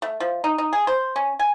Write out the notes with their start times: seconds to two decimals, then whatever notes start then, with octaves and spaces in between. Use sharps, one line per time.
0.02 A3
0.20 F3
0.44 D#4
0.58 D#4
0.73 G#4
0.87 C5
1.16 C#4
1.39 G#5